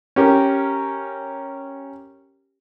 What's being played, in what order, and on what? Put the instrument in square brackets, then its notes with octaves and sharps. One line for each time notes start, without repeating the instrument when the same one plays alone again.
[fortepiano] C#4 G4 A#4